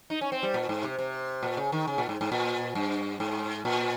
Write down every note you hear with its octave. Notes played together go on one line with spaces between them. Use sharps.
D#4
C#4
C4
G3
A#2
G#2
C3
C3
A#2
C#3
D#3
C#3
A#2
G#2
G#2
A#2
G2
G#2
A#2